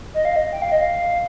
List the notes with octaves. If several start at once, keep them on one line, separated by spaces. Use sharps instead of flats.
D#5
F5
D#5
G5
F5
D#5
F5